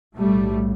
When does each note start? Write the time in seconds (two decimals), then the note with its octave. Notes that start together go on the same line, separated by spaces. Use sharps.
0.14 B1 A2 G3 A3